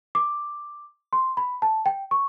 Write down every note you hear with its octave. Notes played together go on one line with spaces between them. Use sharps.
D6
C6
B5
A5
G5
C#6